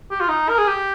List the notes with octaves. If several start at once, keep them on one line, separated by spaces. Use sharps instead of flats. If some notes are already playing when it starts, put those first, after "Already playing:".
G4
F4
D#4
A#4
G#4
G4